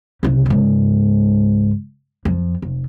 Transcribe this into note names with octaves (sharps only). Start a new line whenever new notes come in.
C2 C#3
C#2 G#2
F2
F1